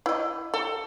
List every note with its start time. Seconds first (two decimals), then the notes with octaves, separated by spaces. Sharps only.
0.06 E4 D#5
0.54 A4